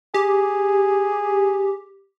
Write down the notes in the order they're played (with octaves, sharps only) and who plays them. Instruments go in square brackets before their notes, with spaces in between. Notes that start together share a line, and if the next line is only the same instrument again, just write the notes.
[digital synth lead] G4 [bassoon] G#4